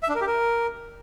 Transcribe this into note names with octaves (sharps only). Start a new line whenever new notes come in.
E5
D4
A#4
G4
A#4